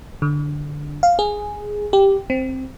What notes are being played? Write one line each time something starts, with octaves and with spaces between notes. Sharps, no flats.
D3
F5
G#4
G4
C4